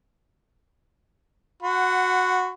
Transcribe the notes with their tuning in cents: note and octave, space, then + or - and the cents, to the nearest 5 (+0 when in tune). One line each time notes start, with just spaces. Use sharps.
F#4 -10 F#5 +0 B5 +40